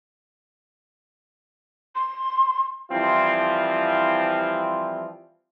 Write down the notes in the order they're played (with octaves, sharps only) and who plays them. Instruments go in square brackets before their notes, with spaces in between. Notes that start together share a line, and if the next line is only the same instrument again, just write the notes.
[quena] C6
[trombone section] E3 F3 G3 C4 E4 F4